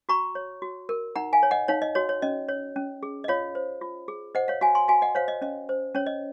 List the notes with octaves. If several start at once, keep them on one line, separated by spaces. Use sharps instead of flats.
F#4 A#5 C#6
C#5
F#4
A#4
D#4 F#5 A#5
F5 G#5
C#5
D#5 F#5
D#4 C#5 F5
D#5
F#4 C#5
C#5
C#4 D#5
C#5
C#4
G#4
D#5
F4 C#5 F5
C5
F4
G#4
C5 D#5 F#5
C#5 F5
F#4 F5 G#5
G#5 C6
F#4 F5 G#5
D#5 F#5
C5 C#5 F5
D#5
C#4 D#5
C5
C#4 C#5
D#5